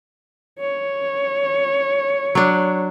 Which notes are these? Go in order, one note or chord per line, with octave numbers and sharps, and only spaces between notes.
C#5
F#3 D4